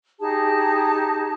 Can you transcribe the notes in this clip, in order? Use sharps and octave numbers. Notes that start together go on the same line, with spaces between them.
D#4 G4 G#4 A5